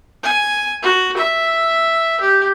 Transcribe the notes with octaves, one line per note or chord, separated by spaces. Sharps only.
G#5
F#4
E5
G4